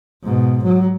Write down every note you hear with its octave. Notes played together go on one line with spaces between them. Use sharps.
G#2 B2
F#3